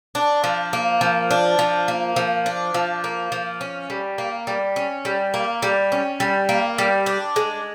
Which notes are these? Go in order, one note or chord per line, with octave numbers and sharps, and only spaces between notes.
D4
F3
A#3
F3
D4
F3
A#3
F3
D4
F3
A#3
F3
C#4
G3
A#3
G3
C#4
G3
A#3
G3
C#4
G3
A#3
G3
D4
G#3